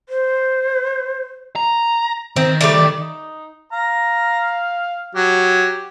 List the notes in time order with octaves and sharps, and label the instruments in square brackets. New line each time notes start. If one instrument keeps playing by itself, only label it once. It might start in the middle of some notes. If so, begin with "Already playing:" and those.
[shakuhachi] C5
[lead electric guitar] A#5
[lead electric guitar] D#3 [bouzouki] C4
[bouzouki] G3 A3 D5
[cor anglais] D#4
[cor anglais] F5 [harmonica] A#5
[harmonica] F#3 [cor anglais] G4